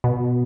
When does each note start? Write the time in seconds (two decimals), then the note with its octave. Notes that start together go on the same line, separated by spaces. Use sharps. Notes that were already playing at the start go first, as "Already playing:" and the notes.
0.04 B2